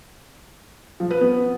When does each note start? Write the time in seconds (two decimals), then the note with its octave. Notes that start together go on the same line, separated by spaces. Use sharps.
1.00 F3
1.11 B4
1.21 B3